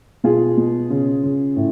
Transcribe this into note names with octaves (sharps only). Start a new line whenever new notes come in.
B2 F4 G#4
B2
C#3
C#3
A2